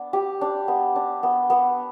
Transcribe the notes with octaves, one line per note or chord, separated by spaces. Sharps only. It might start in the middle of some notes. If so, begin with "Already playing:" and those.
Already playing: B3 D4
G4
D4
B3
D4
B3
B3